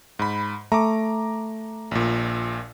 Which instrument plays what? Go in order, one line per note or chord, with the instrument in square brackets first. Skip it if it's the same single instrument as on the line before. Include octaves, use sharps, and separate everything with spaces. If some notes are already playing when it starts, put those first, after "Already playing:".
[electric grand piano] G#2 B5
[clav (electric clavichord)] A3 [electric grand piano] A#5 D6
[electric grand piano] A#1 A#2